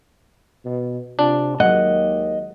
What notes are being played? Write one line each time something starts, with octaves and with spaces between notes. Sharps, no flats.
B2
C3 D4 F4 D5
D#2 F#3 G#3 D#5 F#5